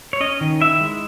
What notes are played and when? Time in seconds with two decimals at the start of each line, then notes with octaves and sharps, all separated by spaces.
0.13 C#5
0.20 C#4 D#5
0.41 D#3
0.61 E4 E5
0.80 G#3